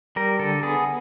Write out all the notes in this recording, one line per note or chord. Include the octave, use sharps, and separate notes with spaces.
G3 A#4
D3 A4
B3 G#4